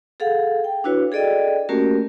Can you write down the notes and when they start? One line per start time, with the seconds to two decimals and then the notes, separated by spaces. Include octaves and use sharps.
0.20 G#4 A4 F5 F#5
0.64 G5
0.84 D4 E4 F#4 B4 C#5
1.12 G#4 A4 D5 D#5 G5
1.69 A3 A#3 C#4 F#4 G4 A#4